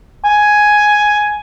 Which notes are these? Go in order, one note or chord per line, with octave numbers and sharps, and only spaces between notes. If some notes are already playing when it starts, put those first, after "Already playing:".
G#5